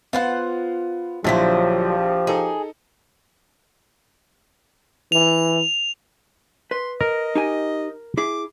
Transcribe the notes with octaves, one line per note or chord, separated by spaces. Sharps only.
B3 F4 C5 F#5
A#1 D3 F3 F#3 E4 G4 C5 B6
D#4 G#4 A4
E3 F7
B4 C6
A#4 D#5
D#4 G4 G#5
E4 G#4 D6